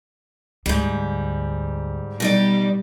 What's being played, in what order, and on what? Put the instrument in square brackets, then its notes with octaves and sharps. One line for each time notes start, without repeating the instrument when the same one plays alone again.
[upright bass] D2 [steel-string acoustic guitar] G#2 G3
[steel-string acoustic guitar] B2 D#4 D5 [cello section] G3